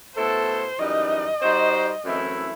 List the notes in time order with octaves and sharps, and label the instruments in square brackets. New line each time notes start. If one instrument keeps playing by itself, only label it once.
[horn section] B2 A3 E4 A4 [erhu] C5
[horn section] F#2 E3 G3 D#4 [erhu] D#5
[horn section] G3 D#4 F#4 C5
F#2 E3 A3 C4 E4